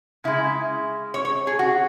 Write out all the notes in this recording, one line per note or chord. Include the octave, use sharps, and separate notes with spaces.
C#3 G#3 E4
C#5
C#5
G#4
F#4